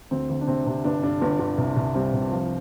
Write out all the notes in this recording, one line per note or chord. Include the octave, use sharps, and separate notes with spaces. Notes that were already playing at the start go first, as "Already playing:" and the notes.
D2 C4
D2
D4
C3 C4
C3
G1 D4
G2 D4
G1
G1
C2
C2
G3 C4
C2
F3